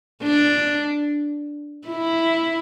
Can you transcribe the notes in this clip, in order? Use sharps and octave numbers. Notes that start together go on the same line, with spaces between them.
D4
E4